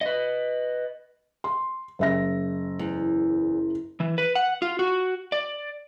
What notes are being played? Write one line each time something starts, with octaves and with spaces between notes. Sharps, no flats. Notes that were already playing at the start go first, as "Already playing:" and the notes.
B4 D#5
C6
F#1 E5 A#6
E2
E3
B4
F#5
F4
F#4
D5